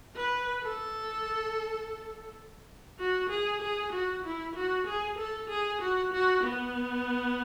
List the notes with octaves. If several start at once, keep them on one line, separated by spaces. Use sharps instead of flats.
B4
A4
F#4
G#4
G#4
F#4
E4
F#4
G#4
A4
G#4
F#4
F#4
B3